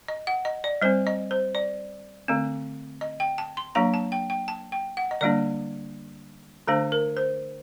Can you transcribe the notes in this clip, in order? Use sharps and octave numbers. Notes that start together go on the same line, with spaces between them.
D#5
F#5
D#5
D5
G3 C4 C5
D#5
C5
D5
D3 A3 C4
D#5
G5
A5
C6
F#3 A#3 D4 A#5
A5
G5
G5
A5
G5
F#5
D#5
D3 G3 A#3 D4 D5
D3 A3 D4 C5
A#4
C5